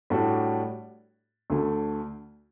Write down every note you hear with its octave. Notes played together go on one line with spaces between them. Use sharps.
A2 G3 D4 F#4 A4
D2 D3 A3